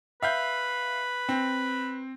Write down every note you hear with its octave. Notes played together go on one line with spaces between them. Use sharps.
B4 E5 F5 G6
C4